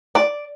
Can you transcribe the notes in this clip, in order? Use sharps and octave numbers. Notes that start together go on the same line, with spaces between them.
D5